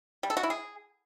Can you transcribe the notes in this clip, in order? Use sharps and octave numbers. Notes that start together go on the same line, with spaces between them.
G3
A4
F#4
E4
G#4